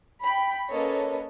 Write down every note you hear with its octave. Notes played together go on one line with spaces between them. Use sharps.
G5 B5
A#3 C#4 A4 B4 C#5 D#5